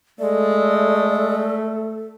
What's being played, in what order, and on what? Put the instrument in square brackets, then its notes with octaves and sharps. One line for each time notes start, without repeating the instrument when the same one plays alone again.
[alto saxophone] G#3 [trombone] A3 [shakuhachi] A4 [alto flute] D5